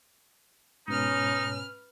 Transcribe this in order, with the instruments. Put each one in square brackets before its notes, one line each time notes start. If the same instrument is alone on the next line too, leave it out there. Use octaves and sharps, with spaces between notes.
[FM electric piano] G#2 B2 [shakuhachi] C#4 [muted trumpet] D#4 [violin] B4 F6